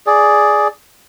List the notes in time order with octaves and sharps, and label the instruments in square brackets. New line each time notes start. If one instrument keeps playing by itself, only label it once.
[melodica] G#4 D5